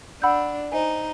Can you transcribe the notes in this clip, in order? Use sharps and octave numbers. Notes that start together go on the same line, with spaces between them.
D4 F#5 B5 E6 G6
D#4 C5 D#5 G#5